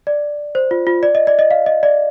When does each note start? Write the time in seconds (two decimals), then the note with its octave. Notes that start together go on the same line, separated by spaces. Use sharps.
0.07 D5
0.55 C5
0.71 F4
0.87 F4
1.03 D5
1.15 D#5
1.27 D5
1.39 D#5
1.51 F5
1.66 D#5
1.83 D5